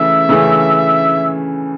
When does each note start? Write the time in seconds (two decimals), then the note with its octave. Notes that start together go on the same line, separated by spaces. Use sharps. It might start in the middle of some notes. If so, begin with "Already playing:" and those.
Already playing: C#3 E3 A3 E5
0.29 C#3 E3 A3